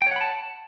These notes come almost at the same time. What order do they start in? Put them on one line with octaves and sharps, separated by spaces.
G5 C#5 F#5 B5 A5